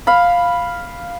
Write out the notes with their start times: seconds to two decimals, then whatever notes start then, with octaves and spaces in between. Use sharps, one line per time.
0.07 F5 B5